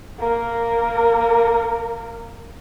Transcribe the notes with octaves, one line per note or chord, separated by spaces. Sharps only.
A#3 A#4